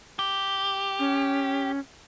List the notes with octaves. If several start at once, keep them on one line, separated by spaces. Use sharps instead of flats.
G4
C#4